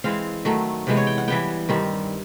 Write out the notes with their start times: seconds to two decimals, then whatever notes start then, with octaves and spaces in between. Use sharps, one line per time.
0.04 E3 G#3 C4 F5
0.45 D#3 F#3 A3
0.87 C3 E3 G#3 B3
0.97 C#5
1.07 G5
1.18 F#5
1.28 E3 G3 B3 G5
1.69 G2 D#3 G3 C4